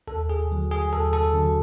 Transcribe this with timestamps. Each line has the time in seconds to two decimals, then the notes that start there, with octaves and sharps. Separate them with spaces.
0.07 D#2 A4
0.29 G#4
0.50 D3 F#3
0.71 G#4
0.92 D#2 A4
1.13 A4
1.34 D3 F#3